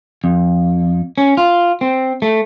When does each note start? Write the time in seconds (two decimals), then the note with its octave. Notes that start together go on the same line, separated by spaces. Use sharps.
0.24 F2
1.18 C#4
1.37 F4
1.81 C4
2.22 A3